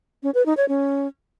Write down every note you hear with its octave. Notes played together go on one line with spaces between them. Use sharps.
C#4
B4
D#4
C#5
C#4